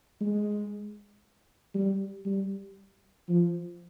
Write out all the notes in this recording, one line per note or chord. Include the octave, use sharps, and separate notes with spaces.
G#3
G3
G3
F3